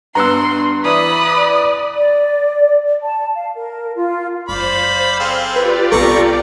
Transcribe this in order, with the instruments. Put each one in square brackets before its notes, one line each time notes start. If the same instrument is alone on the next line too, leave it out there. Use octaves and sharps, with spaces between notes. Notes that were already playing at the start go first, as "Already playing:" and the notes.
[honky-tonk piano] G2 B3 F#6 [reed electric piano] A#5 E6 [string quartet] C6
[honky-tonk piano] E3 [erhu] D5 [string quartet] B5 D#6 F#6
[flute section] D5
A5
F5
A#4
F4
[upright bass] F#1 [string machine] C5 [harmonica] D5 F5 B5
[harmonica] C4 G#4 A4 [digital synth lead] F5
[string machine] F4 G4 D5 [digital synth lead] B4
[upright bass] C2 B3 [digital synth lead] A4 [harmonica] A#5 C#6 D6